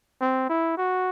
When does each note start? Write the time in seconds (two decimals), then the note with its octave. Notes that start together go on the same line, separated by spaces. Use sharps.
0.21 C4
0.49 E4
0.77 F#4